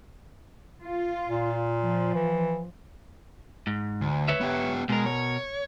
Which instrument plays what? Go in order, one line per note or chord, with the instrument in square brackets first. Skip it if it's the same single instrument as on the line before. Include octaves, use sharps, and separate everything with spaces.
[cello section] F4
[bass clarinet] A#2
[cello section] F3
[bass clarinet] E3
[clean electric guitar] G#2
[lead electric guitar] D2
[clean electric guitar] B4 C#5 E5
[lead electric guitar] B3 G4
[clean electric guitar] B2 A#4 [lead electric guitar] G#3
[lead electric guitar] C#5